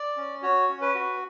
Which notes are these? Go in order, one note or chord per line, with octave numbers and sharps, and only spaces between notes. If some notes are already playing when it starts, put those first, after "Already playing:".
Already playing: D5
C#4
F#4 C#5
C#4
B4
F#4